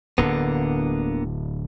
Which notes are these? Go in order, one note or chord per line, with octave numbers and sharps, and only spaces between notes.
D1 D3 A#3 B3 D4